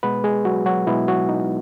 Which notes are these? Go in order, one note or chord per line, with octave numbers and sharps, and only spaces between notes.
B2 G#3 B3 B4
G#3 G#4
F#3 F#4
F#3 F#4
B2 G#3 B3 E4
F#3 F#4
D#4